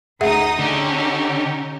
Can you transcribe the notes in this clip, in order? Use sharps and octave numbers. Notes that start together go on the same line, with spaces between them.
D2 D#4 G#4 E5 F#5 D#6
D3 C#4 D#4 G4